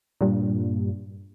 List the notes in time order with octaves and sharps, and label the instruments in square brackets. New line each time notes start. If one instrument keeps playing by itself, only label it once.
[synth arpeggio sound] G2 A#2